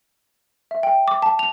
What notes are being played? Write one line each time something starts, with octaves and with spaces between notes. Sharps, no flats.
E5
G5
D6
A5
F7